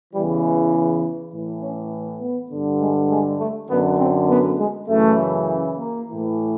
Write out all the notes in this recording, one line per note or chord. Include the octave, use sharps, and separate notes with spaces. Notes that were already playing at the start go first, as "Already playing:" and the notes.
E2 C#3 E3 G3
G#3
A2 E3
C#4
B3
G2 D3
G#3
G#3
A3
F#2 D3 B3
C4
B3
G#3
F#2 C#3 E3 A3
A#3
A2 E3